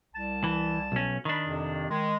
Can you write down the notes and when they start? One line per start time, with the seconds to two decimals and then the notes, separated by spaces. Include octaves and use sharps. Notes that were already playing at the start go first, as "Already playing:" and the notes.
0.14 C2 A5
0.44 E3
0.92 B1 C#4
1.25 D#3 D4 B5
1.46 F2 C3
1.89 D#3 G#3